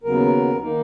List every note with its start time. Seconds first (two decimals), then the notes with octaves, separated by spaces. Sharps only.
0.03 D#2 C#3 F#3 B3 A#4
0.62 D#3 A#3 D#4